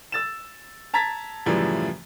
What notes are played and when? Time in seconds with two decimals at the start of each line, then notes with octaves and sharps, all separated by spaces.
0.12 E6 A6 E7
0.94 A5 A#5 G#6 A6 B6
1.46 F#2 A2 C#3 E3 F3 G3